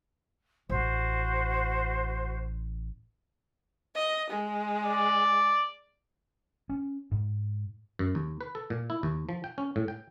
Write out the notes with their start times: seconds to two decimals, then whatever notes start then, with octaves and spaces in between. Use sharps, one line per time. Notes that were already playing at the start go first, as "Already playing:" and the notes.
0.69 A1 F#4 C5
3.95 D#5
4.30 G#3
4.85 D5
6.69 C#4
7.11 G#2
7.99 F#2
8.15 D#2
8.41 B4
8.55 A4
8.70 A#2
8.90 E4
9.03 D#2
9.29 F3
9.44 G5
9.58 C#4
9.76 A2
9.88 G5